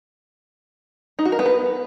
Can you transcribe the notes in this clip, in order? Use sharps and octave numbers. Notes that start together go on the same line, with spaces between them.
D#4
F#4
A#4
B3
B4